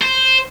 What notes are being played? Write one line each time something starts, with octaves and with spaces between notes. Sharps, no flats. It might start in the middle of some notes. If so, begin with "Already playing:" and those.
C5